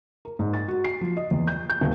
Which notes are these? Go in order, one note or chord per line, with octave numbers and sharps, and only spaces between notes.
A#4
G#2
A6
F#4
C7
F3
D#5
E2
G6
G6
D#1